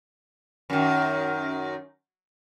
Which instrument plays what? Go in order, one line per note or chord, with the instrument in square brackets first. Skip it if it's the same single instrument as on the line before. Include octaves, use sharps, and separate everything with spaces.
[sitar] F#2 D#3